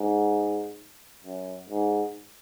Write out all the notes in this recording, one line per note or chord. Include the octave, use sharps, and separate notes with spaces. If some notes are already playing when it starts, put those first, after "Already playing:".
Already playing: G#2
F#2
G#2